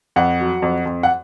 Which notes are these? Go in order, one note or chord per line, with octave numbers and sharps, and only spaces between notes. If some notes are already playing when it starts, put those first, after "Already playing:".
F2 F#5
F#3
F2
F2
F#5